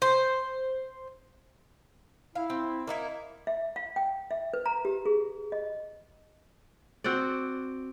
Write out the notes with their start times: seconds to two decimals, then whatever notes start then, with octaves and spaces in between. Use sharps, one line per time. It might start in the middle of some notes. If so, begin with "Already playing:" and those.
0.02 C5
2.35 E4 F5
2.50 C4
2.87 A#3 D#4 E4
3.47 E5
3.76 F5
3.96 G5
4.31 E5
4.54 B4
4.66 A#5
4.85 G4
5.06 G#4
5.52 D#5
7.04 C4 F#4 C5 D5